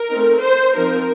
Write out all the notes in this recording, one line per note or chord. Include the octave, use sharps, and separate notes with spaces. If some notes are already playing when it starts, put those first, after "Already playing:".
Already playing: A#4
A3 C4 D#4
C5
F3 C4 D#4 A#4